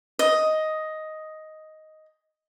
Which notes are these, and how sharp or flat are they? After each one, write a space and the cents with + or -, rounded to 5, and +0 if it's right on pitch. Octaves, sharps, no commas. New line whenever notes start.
D#5 +5